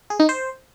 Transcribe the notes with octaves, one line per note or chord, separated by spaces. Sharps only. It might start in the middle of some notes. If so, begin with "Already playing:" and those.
G#4
D#4
C5